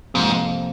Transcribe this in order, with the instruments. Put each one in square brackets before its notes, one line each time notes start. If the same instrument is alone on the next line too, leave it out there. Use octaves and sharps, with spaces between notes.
[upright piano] F2 C3 F3 A#3 F4 [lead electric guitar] G#2